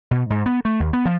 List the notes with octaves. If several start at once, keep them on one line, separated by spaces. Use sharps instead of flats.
B2
G#2
B3
A3
D#2
B3
F3